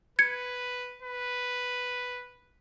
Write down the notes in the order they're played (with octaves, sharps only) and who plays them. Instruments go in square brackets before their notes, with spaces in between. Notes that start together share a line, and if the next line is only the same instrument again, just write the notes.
[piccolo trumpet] B4 [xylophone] G#6 C#7
[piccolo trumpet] B4